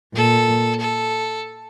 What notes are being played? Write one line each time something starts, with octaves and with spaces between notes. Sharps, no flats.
A#2 A4
A4